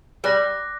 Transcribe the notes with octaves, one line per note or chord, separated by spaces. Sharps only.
G3 D6 F#6 A#6